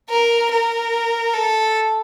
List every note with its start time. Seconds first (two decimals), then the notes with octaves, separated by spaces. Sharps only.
0.10 A#4
0.51 A#4
1.34 A4